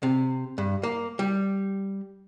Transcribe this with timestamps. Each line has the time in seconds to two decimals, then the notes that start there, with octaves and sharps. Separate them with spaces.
0.03 C3
0.58 G2
0.83 A#3
1.19 G3